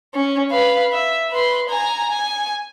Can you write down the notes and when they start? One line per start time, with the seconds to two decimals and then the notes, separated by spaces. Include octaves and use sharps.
0.14 C#4
0.51 B4 F5
0.92 E5
1.31 B4 C6
1.69 G#5 A#5
2.09 G#5